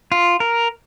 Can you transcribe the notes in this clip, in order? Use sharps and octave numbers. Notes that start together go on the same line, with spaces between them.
F4
A#4